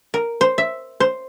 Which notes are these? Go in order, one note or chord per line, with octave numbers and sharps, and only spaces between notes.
A#4
C5
E5
C5